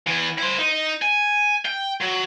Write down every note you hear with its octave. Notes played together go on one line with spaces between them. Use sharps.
E3 B3
E4 C5
D#4
G#5
G5
F#3